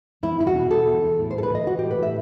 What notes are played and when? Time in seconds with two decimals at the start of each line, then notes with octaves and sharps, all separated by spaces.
0.23 E2 E4
0.39 E2 E4
0.47 F#4
0.55 B2
0.71 B2 A4
0.87 E2
1.03 E2
1.19 A2
1.31 C5
1.35 A2 A4
1.43 B4
1.51 E3 D#5
1.67 E3 F#4
1.79 A2 G4
1.91 B4
1.99 A2 E5